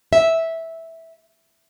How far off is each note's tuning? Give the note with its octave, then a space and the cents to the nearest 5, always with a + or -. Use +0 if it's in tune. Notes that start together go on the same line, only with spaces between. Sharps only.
E5 -10